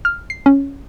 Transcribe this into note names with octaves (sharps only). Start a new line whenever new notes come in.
F6
C7
C#4